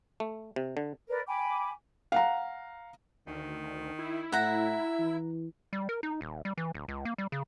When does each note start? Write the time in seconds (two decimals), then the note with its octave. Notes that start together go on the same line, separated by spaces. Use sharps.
0.20 A3
0.56 C3
0.77 D3
1.08 A#4 B4 D5
1.27 G5 G#5 B5 D6
2.12 F5 F#5 A#5
3.27 D2 D#3
3.99 E4
4.32 A2 E5 F#5 A#5
4.99 E3
5.73 G3
5.89 A#4
6.03 D#4
6.21 D#1
6.45 G3
6.58 E3
6.75 D1
6.88 C#2
7.05 A#3
7.18 G3
7.32 C#3